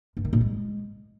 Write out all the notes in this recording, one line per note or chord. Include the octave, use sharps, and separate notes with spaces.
G2
D#3
A#2
G#3